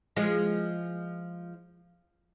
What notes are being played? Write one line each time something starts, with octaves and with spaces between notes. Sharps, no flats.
F3 G#3